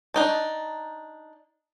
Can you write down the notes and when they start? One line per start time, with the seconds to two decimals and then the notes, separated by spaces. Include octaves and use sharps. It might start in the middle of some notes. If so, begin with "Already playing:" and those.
0.14 D4 D#4 A5